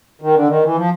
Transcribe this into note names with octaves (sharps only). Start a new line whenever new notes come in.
D#3
D3
D#3
E3
F3